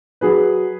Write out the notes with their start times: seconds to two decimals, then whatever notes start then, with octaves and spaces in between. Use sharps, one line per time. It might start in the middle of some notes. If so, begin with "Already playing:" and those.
0.21 F#3 G#4 B4